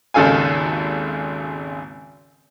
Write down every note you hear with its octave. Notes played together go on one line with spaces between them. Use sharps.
G#1 D#2 C#3 A4 F5 G#5